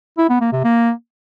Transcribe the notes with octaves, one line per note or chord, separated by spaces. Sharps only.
E4
B3
A#3
C3
A#3